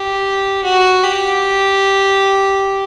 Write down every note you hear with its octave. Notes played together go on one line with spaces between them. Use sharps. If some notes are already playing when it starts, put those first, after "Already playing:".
Already playing: G4
F#4
G4